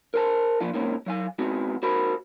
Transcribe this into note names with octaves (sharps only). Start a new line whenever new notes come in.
A#4 C5 A5
A#2 F3 D4 F4
G#2 A#3 C4 C#4
F#3 F5 G#5
G#3 B3 C4 F#4
F#4 A#4 C5 B5